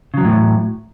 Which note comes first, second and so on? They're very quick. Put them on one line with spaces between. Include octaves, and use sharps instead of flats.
C#3 F#3 E2 A2